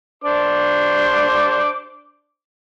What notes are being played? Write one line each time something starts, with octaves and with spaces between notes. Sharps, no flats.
D4 C5 D6